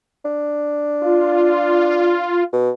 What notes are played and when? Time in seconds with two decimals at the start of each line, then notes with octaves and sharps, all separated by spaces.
0.25 D4
1.02 F4
2.53 B2